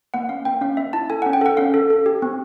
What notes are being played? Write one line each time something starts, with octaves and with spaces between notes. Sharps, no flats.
A#3 F#5
C#4 F5
A#3 G5
C#4 F5
A#3 E5
E4 A5
A4 G#5
C#4 F#5
G5
A4 F#5
C#4 F5
A4
A4
G4
C4